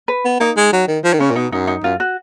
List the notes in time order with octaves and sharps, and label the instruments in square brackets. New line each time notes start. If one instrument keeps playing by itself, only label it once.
[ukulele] B4
[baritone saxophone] B3
[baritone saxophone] A#3 [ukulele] D#4
[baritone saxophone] G#3
F#3
D#3
F3
D#3
[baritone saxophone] C#3 [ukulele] C#4
[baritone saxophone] A#2
[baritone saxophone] B2 [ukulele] D#4
[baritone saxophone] F#2 [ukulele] D#4
[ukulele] D#4
[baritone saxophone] F#2 [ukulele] F4
[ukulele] F#4